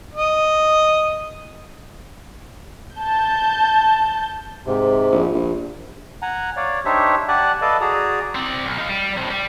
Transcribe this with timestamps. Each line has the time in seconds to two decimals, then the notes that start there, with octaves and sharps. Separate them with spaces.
0.14 D#5
2.97 A5 G6
4.66 G#2 C3
5.12 A#1
5.34 A#1
6.22 F#5 G#5 A#5
6.57 C#5 D5 F5
6.85 D4 D#4 G4 C5 C#5 E5
7.28 G4 D5 F#5 G#5 A5 F#6
7.62 A4 B4 D5 D#5 F5 A5
7.81 F#4 G#4 D5 A#5 D#6
8.35 C4 D5
8.64 B1
8.78 D#4 F5
8.89 G3
9.18 A2 C3
9.31 G3